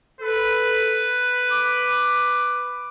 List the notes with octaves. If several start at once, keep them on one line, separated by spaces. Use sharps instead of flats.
A4 B4
D6